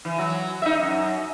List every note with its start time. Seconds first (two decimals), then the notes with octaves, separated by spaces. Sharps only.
0.05 E3
0.18 F#3
0.62 D#4 E5
0.80 F#2